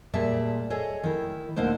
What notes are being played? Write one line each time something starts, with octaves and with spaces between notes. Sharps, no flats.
A#2 G3 G#4 D5 E5 A5
G#4 A4 C#5 D#5
D#3 E4
D2 A#2 D3 A#3 D#4 C5